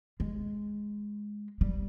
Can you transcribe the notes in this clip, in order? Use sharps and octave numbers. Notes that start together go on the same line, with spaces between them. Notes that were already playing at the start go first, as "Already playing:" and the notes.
G#3
G3